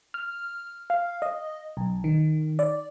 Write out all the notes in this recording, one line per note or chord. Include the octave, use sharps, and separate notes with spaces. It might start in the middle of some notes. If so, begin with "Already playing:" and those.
F6
F5
D#5
B1
D#3
D5